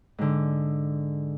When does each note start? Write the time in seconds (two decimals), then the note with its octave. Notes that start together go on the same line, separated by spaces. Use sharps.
0.18 G#2 D3